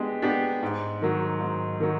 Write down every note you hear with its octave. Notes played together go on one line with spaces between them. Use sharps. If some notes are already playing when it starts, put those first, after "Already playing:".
Already playing: G#3 B3 D4 G4
B3 D4 G4
G#2
D#3 F#3
G#2
D#3 F#3